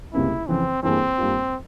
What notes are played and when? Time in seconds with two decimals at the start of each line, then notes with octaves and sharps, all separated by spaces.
0.13 C#2 C3 G3 A#3 C#4 E4
0.48 F2 C#3 E3 C4
0.83 G2 E3 A#3 C4 E4 G#4
1.18 G2 G3 A#3 F4